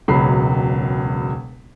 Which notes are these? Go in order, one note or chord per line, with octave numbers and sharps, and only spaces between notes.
E1 C#2 F#3 B5 C7